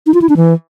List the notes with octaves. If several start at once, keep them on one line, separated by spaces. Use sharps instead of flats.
D#4
F4
E4
D4
E3